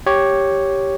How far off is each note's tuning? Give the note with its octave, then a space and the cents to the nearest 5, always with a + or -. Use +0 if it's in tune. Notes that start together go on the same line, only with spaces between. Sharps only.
G4 +0 C#5 +0